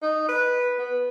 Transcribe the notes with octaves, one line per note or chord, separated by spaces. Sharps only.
D#4
B4
B3